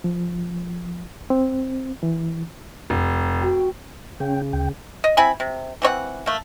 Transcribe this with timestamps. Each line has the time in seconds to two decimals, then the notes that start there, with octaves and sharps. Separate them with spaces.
0.04 F3
1.30 C4
2.03 E3
2.90 F1
3.41 F#4 G5
4.20 C#3 C#4 G5
4.53 D2 G5
5.04 D#5
5.17 C4 E4 G#5 B5
5.40 C3
5.82 E3 C4 C#5 F#5
6.26 A3 A#3